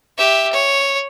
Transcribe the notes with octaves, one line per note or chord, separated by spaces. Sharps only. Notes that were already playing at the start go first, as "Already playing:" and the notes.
G4 E5
C#5